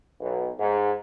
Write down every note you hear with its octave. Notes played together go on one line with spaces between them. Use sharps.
B1
G#2